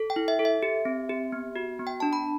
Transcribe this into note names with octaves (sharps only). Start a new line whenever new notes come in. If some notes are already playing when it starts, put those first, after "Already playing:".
Already playing: A4
G5
E4
E5
A4
E5
G4
C4
G4
B3
F#4
B3
G5
D4 A5
B5